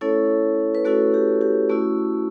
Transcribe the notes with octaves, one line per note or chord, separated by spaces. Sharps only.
A3 C#4 E4 A4 C#5
B4
A3 C#4 E4 F#4 A4
G4
G4
A3 C#4 E4 F#4